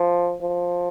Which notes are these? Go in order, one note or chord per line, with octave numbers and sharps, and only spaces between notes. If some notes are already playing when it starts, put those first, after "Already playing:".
Already playing: F3
F3